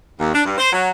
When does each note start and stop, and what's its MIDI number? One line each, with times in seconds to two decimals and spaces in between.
0.19 0.30 39
0.34 0.41 62
0.45 0.56 43
0.57 0.68 72
0.72 0.90 54